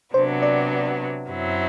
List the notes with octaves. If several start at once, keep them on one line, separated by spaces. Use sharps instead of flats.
C3 F#3 B3 D4 C5
D5
F#2 F#3 C4 E4